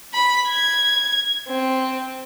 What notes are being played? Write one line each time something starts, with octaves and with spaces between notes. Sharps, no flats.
B5
G#6
C4